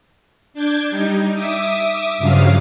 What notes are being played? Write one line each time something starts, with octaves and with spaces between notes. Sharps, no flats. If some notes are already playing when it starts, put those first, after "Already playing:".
D4 D6 G6 G#6
G3 D#4
E5 D6 D#6
G2 C#3 F3 F#3 F5